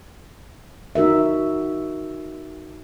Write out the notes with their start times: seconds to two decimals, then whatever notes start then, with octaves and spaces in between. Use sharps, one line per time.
0.95 D#4 F#4 A#4 E5